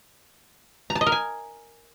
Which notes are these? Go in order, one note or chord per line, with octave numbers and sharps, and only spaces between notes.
A#5
A5
D#5
A#4
G#5